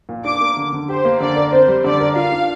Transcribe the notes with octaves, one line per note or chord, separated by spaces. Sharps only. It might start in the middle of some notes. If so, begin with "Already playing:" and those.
A#2
D4 D6
A#3
D3
D3
G4 C5
A#3
D3 D5
A#4
C4 C5
G3
D3 D5
A#4
F4 F5
D4